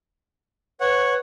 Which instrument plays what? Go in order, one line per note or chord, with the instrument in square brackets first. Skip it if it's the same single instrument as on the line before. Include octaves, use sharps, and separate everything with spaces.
[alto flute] B4 [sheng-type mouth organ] C#5 F#5